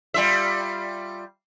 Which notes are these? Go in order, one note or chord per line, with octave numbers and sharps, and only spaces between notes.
G3 F4 E5